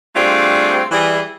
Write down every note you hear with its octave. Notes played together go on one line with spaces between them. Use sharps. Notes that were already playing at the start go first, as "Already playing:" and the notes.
G3 A3 C4 D4 F4 G#4
E3 G3 G#4